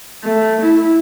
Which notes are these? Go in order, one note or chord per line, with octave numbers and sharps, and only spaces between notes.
A3
E4